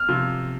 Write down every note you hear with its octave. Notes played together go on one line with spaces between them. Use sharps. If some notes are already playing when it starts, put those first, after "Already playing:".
Already playing: F6
C3 F3